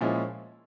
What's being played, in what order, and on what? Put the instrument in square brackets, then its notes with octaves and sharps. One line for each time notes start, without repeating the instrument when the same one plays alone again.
[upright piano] A#2 F3 G#3 C#4 E4